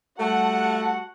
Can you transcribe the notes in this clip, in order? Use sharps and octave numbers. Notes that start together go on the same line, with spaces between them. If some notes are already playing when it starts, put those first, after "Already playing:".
G3 A3 F#4 F#5 A5